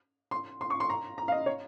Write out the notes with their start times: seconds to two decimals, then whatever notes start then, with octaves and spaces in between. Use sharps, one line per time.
0.31 C6
0.61 C6
0.70 C#6
0.80 C6
0.90 A#5
1.18 A#5
1.28 F5
1.32 D#5
1.46 C#5